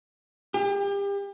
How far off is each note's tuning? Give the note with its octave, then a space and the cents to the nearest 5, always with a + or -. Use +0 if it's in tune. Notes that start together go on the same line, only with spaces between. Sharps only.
G4 +35